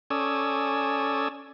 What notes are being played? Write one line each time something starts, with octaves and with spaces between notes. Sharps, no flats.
C#4 A4 D5 G#5 D#6 E6